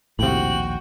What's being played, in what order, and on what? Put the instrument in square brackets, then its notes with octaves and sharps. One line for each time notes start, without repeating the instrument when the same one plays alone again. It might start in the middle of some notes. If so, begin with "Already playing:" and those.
[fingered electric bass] A#1 D#2 [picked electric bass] A2 C3 [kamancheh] F#4 G5 [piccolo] F#7